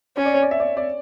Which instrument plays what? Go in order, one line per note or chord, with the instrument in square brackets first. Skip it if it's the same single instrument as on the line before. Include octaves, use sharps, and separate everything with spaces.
[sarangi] C#4 [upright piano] C#5
[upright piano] D5
C#5
D5
E5
D5
D5